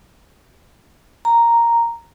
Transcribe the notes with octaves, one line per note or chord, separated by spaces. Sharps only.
A#5